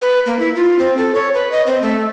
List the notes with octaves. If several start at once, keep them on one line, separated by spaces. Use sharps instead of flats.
B4
A#3
E4
F4
C4
A4
C#5
B4
D#5
C4
A3